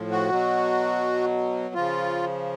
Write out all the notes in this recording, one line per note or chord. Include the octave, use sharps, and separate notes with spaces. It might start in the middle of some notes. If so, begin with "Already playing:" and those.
Already playing: A2 F3
F#4
B2 F#3
C#3 F3 F4